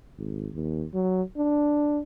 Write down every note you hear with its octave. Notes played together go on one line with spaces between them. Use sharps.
G#1
D#2
F#3
D4